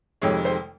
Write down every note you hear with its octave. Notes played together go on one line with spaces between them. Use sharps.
F1 F2 C3 D#3 G#3 C#5
C5